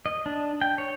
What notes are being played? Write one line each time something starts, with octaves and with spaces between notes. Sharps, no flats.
D#5
D4
G5
C#5